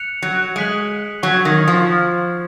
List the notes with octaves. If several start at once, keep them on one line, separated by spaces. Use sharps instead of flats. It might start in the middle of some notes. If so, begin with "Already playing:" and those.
Already playing: F#6 C#7 F7
F#3
G#3 F#6 B6 F#7
F#3 C#6 G#6 B6
D#3
F3